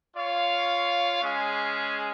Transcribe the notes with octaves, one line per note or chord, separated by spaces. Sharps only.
F4 C#5 F5
G#3 C#4 G#4